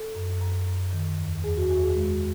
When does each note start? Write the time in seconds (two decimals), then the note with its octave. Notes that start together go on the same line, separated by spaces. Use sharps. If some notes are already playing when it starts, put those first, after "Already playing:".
Already playing: A4
0.15 F#2
0.41 F#2
0.67 F#2
0.93 D#3
1.19 E2
1.44 E2 G#4
1.57 F#4
1.69 E2 F#4
1.82 G#4
1.95 G#3